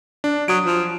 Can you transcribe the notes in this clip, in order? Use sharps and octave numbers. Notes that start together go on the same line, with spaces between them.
D4
F#3 D#6 D7
F3